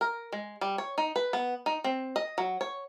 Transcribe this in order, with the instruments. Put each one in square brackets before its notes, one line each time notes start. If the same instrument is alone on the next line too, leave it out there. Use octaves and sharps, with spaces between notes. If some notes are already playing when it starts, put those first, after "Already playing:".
[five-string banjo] A#4
G#3
G3
C#5
D#4
B4
B3
D#4
C4
D#5
F#3
C#5